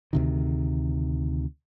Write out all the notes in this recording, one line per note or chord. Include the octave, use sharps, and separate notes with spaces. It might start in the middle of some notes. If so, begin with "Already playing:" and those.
D2 C3 D#3